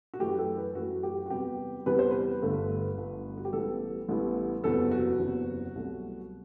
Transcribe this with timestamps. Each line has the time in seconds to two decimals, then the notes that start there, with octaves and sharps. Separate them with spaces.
0.14 F#4
0.19 F#2 E3 A3 G4
0.39 A4
0.57 B4
0.75 F#2 E3 A3 F#4
1.03 G4
1.26 F#4
1.30 E2 C3 G3 B3 G4
1.86 E2 C3 G3 B3 B4
1.99 C5
2.11 B4
2.42 G1 G2 D3 A3
2.98 G1 G2 D3 A3
3.38 F#4
3.45 G4
3.53 A1 A2 G3 B3 A4
4.08 A1 A2 G3 B3
4.64 F#1 E2 C3 F#3 B3 A4
4.91 F#4
5.19 F#1 E2 C3 F#3 B3
5.75 C2 B2 F#3 A3